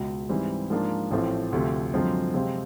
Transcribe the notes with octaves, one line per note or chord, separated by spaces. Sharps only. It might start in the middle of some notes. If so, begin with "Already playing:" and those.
Already playing: C#2 B2 G#3
G#2 E3 G3 C4
G#2 F3 A#3 D4 F4
A1 A2 F3 A3 C4
D2 C3 F3 A3
F#2 D3 F3 G#3 C4
C3 F3 G#3 C4 F4